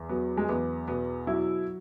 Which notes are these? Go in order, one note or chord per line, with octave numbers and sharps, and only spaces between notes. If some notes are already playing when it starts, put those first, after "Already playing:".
Already playing: E2
F#3 B3
G#3
E2 B3
B2 B3
F#3 E4